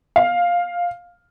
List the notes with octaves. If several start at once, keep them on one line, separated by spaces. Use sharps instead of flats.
F5